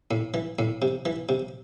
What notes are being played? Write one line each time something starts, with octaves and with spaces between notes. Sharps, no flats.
A2
E3
A2
C3
E3
C3